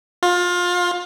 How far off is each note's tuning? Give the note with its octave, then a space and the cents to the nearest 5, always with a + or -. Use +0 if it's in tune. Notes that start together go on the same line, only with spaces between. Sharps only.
F4 +25